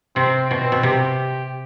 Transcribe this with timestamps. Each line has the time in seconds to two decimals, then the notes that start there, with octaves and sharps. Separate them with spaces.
0.16 C3 C4
0.50 B2 C4
0.72 B2
0.83 C3 G4